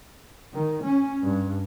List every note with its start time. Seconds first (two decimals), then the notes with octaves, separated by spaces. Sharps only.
0.54 D#3
0.85 C#4
1.22 G2